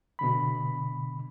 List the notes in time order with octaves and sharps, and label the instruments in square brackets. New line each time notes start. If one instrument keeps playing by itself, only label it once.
[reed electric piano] B2 D3 B5